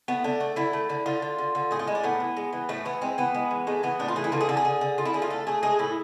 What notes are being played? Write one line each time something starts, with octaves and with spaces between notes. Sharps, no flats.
A3 B3
D3 D4
A3
D3 E4
A3
D3
D3 F4
D3
D3
D3
A2 G#4
F4
G#3 E4
D4
A2 B3
E3
G#3
E3
A2 A3
E3 B3
G#3 C4
E3 B3
G#3
E3
G#3 A3
E3 B3
A2 D4
F4
E3 G#4
E4
D3 F4
G#4
D3 A4
G#4
D3
D3
D3 F4
E4
D3 G#4
F4
A3 A4
A3 G#4
G#3 G#4
A2 E4